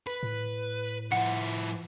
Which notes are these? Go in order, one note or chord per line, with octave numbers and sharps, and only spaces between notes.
B4
A2
F3 E4 F#5